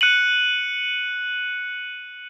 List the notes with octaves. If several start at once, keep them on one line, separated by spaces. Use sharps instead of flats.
F#6 C#7 D#7 F#7